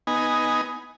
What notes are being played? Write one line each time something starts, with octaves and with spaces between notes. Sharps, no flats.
B3 D#4 G#5